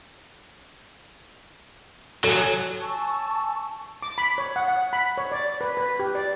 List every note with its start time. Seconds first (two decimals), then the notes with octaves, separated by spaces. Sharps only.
2.24 F#3 A4 G#5
2.80 G#5 A5 C#6 E6
4.03 D6
4.18 B5
4.38 C#5
4.56 F#5
4.68 F#5
4.93 B5
5.18 C#5
5.32 D5
5.61 B4
5.77 B4
5.99 G4
6.15 D5